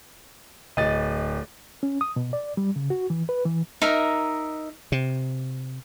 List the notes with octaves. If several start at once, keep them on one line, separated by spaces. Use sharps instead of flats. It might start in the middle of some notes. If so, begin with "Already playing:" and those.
D1 D#5 A6
C#4
D#6
B2
D5
G3
C#3
F#4
E3
B4
E3
D#4 A#4 E5
C3